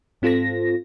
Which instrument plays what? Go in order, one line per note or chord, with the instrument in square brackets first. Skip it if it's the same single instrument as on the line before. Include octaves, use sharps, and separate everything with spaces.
[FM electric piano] G#2 C4 F4 A4 C5 A#6